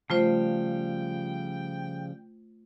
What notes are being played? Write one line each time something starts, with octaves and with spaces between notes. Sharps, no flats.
C#3 F3 G3 A3 F4 C5 G5